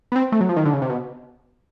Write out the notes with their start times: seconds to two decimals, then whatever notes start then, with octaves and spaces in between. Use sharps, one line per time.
0.12 B3
0.16 C4
0.32 A3
0.41 F#3
0.49 F3
0.57 D#3
0.65 D3
0.73 C#3
0.82 C3
0.90 B2